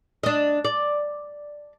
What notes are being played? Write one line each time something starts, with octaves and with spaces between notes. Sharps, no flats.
D4 D#5
D5